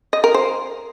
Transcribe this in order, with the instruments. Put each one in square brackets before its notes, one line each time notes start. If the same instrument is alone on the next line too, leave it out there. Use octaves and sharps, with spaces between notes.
[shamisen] D#5
A#4
C5